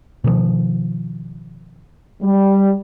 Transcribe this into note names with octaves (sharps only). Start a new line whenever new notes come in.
B2 D#3 F3
G3